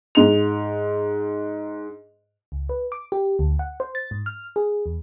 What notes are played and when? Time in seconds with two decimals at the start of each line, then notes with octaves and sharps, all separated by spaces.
0.15 G#2 F7
2.52 C#2
2.69 B4
2.92 D6
3.12 G4
3.39 D2
3.59 F#5
3.80 C5
3.95 A6
4.11 G#2
4.26 F6
4.56 G#4
4.86 E2